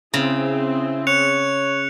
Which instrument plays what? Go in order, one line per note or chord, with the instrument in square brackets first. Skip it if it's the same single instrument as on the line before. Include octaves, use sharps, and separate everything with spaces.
[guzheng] C#3 [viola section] C4 G#4 [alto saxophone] E4
[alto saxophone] C#5 [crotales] F#6 C#7 F7